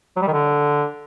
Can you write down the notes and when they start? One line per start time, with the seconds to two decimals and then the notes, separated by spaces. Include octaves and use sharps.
0.16 F#3
0.22 G3
0.27 D#3
0.33 D3